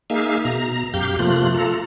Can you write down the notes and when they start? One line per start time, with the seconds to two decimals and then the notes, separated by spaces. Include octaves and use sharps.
0.10 A#3 D#4 G#4 E5 F5
0.45 B2 A#5
0.94 F#2 G4 F5 G6
1.19 C3 F3 A3 A#3 F4 F#6
1.54 F4 A4 A#5